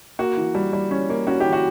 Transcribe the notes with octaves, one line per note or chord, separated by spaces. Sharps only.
A#3 F#4
E3
G3
G3
C#4
A#3
C#4 F#4
E3 G4
F#4